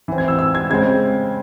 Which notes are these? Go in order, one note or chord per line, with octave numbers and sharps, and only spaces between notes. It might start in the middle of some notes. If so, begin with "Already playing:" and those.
E3 C4
G#6
E6
E6
G#6
C#3 G#3 C4 G#6